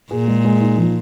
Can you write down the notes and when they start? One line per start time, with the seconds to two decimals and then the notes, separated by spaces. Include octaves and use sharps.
0.11 A#2 G#4
0.28 G#3
0.45 G#3
0.61 D#4
0.78 F3